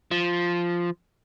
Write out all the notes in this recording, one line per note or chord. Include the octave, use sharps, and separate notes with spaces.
F3